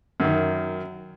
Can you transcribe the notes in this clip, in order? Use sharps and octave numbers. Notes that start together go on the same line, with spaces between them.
F#2 D#3